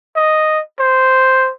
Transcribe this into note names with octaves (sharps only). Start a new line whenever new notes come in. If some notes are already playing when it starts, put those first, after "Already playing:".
D#5
C5